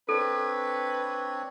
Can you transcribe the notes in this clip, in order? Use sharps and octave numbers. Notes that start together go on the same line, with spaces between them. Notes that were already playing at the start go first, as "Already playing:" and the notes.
C4 D4 A4 B4 C#5